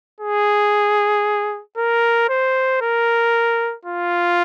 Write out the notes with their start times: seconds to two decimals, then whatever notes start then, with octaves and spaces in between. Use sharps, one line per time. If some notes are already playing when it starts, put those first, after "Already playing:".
0.21 G#4
1.77 A#4
2.29 C5
2.81 A#4
3.85 F4